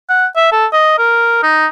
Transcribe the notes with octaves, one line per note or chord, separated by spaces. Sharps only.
F#5
E5
A4
D#5
A#4
D#4